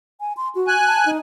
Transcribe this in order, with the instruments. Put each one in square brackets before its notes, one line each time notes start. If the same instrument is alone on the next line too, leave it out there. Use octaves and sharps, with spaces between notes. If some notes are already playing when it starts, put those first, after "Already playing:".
[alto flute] G#5
C6
F#4
[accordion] G#5 F#6
[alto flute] A5
D#4